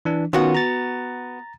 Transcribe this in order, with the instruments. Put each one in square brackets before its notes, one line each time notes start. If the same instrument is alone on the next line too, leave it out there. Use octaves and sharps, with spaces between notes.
[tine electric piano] E3 D4
[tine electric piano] D#3 C#4 F4 [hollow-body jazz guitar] B3 F#4 F#5
[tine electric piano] A#5 A6